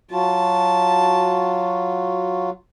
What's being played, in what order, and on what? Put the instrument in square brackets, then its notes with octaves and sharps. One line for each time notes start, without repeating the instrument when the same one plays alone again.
[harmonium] F#3 F4 F#4 [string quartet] A5